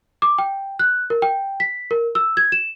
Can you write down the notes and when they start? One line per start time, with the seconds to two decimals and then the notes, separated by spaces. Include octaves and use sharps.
0.22 D6
0.38 G5
0.79 F#6
1.10 A#4
1.22 G5
1.60 B6
1.91 A#4
2.15 E6
2.37 G#6
2.52 E7